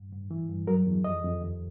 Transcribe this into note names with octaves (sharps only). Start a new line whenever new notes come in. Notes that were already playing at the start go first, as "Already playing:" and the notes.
Already playing: G2
G2
E3
G2
F#3 A#4
E2
F2 D#5
F2
D#2